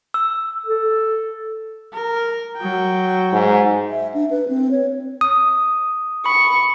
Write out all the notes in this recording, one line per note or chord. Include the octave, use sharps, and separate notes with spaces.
E6
A4
A#4
F#3 G5
G#2
E5
D4
B4
C4
C#5
D#6
B5 C#6